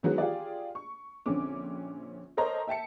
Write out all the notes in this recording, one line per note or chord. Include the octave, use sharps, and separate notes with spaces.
D#3 E3 F#3 G#3 B3 F#4
F4 G4 G#4 D5
C#6
A#1 D3 C4 C#4 D6
A4 A#4 C5 C#5 D#5 A#5
E5 G5 A5 C#7